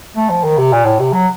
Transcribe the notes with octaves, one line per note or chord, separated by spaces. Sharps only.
A3
F3
D#3
C3
A#2
A2
C3
F#3